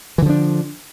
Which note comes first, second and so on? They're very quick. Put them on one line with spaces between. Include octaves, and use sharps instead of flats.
E3 D3 F3 D4